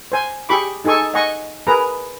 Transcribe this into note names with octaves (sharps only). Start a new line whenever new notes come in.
C5 G#5
G4 G#4 B5 C#6 D6
D#4 G#4 A4 G#5 C#6
D#5 F#5 G#5 C#6
G#4 A#4 B4 A#5